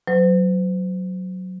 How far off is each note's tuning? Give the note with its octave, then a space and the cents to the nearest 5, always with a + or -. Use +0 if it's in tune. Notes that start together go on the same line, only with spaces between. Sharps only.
F#3 +0 C5 -45